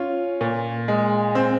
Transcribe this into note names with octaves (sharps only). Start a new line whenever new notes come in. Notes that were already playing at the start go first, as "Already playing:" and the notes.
Already playing: C#4 F4
A#2
G#3
C4